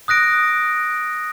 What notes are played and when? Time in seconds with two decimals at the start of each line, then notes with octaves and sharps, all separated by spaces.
0.08 D#6 F#6 A#6 D7